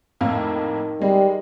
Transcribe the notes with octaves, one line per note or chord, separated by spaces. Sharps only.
F2 A2 D#3 A#3
G3 G#3